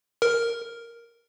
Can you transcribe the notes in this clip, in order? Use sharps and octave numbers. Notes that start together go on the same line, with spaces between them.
A#4